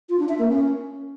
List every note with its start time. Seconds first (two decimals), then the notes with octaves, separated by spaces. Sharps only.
0.09 F4
0.19 D4
0.29 E5
0.39 A#3
0.48 C#4